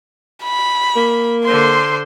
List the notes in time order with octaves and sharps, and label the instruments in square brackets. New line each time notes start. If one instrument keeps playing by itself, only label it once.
[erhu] B5
[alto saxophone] A#3
[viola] D3 C6 [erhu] C5